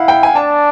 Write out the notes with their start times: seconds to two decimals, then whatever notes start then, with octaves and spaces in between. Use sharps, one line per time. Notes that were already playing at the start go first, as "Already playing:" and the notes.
Already playing: E4 F5 F#5
0.08 G5
0.23 G#5
0.35 D4 A5